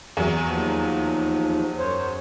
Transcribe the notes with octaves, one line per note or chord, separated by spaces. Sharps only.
E2 F#3
D#2 F3
F#2 C5 C#5